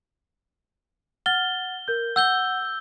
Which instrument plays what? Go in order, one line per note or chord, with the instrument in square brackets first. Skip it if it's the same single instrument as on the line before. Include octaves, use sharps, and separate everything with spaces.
[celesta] F#5 F6 A6 [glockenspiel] G7
[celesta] A#4 G6
[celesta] F#5 [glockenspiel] E6 G6 G7